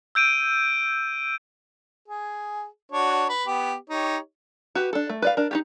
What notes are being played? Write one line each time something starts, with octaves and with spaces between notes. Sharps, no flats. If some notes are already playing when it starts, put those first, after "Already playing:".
E6 G6 D7 D#7
G#4
D4 F#4 C#5
B4
B3 G4
D#4 G4 C#5
F#4 G4 B4
D4 A4
A3
B4 D5 F5
D4 A#4
D#4 F4 G4